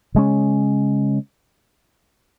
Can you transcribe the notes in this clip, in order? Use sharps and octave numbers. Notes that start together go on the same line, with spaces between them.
C#3 G#3 C#4